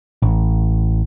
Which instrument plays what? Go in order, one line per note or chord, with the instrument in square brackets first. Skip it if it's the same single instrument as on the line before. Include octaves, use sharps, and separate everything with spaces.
[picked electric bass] A1